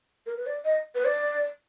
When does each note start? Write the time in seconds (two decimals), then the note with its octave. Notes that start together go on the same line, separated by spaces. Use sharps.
0.26 A#4
0.37 B4
0.47 D5
0.65 D#5
0.95 B4
1.05 D5